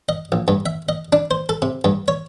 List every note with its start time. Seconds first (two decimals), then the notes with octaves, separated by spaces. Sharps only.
0.09 D#5
0.32 A#1
0.48 G2
0.66 E5
0.89 D#5
1.13 D4
1.31 C5
1.49 A4
1.62 C3
1.84 G2
2.08 C#5